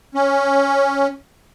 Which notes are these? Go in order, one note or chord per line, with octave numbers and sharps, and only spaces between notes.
C#4